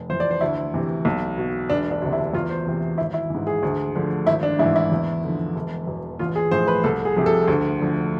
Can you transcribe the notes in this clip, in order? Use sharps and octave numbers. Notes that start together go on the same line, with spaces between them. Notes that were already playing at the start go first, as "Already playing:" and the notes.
Already playing: F1
F2 E3 C5
D5
C5
D2 E4
C3 E3
B1
B2
E1 D4
D4
D2 C3
E4
E2 F4
C5
C3 E3
G#1 E4
E4
G#2 E3
G#4
D2
D3 F3
G#1 E4
D4
G#2 E3 E4
E4
E2
D3 F3
E1
E2 B2
A1 F4
G#4
A2 F3 C5
B4
C2 A4
G#4
C3 F3
A4
D2
D3 F3